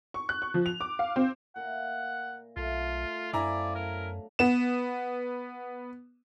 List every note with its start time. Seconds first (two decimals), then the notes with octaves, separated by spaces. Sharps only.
0.14 C#6
0.29 F#6
0.42 C#6
0.54 F3
0.66 F7
0.81 D6
0.99 F5
1.16 C4
1.56 A#2 A#4 E5 F#5
2.57 B1 A3 F4 F5
3.33 F#2 F3 B3 E4 D5 G#5 A#5
3.75 F#3 D4 A#4
4.39 B3 E7